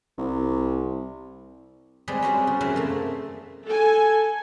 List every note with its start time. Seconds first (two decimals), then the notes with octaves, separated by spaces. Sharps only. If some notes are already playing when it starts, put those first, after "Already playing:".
0.18 C2
2.08 G3 G#3 C4 G4 G#4 B4
2.22 C4 C#4 F#4 B4 F#5
2.47 C#3
2.61 F#2 C3 E3 A#4 B4 E5
2.76 A3 A#3
3.66 A4 G#5